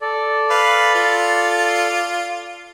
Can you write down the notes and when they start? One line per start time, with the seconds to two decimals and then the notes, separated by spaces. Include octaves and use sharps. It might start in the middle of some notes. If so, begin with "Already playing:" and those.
0.01 A4 D5
0.50 B4 F5
0.95 F4